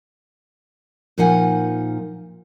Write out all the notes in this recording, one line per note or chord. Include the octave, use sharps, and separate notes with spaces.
A#2 F3 D#4 F#5 G#5